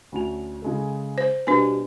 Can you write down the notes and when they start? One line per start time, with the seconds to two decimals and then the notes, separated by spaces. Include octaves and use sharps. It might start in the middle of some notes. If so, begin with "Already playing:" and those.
0.12 D2 C#4 F7
0.62 C#3 G#3 A4
1.18 C5
1.47 B2 G3 D4 B4 G#5